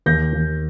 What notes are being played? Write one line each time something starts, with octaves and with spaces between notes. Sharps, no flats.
D#2 G6 A#6
D#2